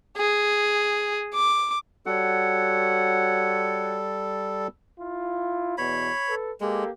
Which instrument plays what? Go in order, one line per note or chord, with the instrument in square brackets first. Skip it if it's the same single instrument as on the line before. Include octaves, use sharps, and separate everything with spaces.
[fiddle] G#4
D6
[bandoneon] G3 A4 [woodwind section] F#4 C#5 F#5
[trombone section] E4 F4
[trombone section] E2 B2 [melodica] C#5 B5
[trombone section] A4 B4
[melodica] G#3 [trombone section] A#3 G4 A4